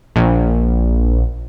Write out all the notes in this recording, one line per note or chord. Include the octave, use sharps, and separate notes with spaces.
A#1